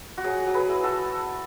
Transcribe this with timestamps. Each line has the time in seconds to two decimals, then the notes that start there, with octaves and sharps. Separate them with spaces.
0.17 F#4
0.24 F#3 G#4
0.47 F#3
0.54 G#4 B4
0.69 E4
0.83 F#4 A4